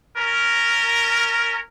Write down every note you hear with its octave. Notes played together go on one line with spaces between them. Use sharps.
C#4 A#4